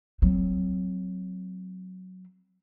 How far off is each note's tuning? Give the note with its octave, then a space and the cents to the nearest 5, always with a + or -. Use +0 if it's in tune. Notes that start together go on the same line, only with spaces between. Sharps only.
F#3 +0 C4 -5